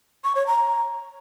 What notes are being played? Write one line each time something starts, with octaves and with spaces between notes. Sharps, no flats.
C#6
C#5
A#5